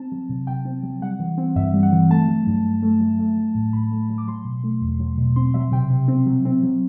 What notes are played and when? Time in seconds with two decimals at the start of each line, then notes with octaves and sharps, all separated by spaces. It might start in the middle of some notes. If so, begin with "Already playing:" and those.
Already playing: C4 A5
0.12 F#3
0.29 C3
0.47 C3 G5
0.65 C4
0.83 F#3
1.01 G3 F#5
1.20 E3
1.38 C4
1.56 G2 E5
1.74 G3
1.83 F#5
1.92 E3
2.10 A3 A5
2.28 F#3
2.47 G2
2.64 G2
2.83 A3
3.00 F#3
3.19 A3
3.37 F#3
3.55 A2
3.73 A2 B5
3.91 A3
4.10 F#3
4.18 D6
4.28 F#3 C6
4.45 B2
4.64 A3
4.81 E2
5.00 F#3
5.18 B2
5.36 C4 C6
5.54 F#3 E5
5.72 C3 G5
5.90 C3
6.08 C4
6.26 F#3
6.45 C4
6.63 F#3